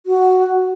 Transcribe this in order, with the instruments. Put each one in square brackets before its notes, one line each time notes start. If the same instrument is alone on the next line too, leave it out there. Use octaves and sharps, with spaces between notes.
[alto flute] F#4